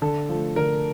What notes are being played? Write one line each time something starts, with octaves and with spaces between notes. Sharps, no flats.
D3 A4
F3 A3
D3 A#4